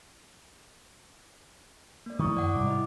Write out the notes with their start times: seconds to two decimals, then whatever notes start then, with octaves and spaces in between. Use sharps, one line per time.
2.06 A#3 D5
2.19 D#3 F3 A3 E4 C#6 D#6
2.37 F#2 D5 F#5
2.54 G#2 C3 G3 D6
2.67 E4 D#5